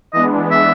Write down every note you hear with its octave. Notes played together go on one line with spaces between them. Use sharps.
E3 G#3 B3 D4 D#5
E5